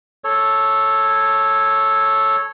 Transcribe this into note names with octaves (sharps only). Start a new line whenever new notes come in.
A4 C#5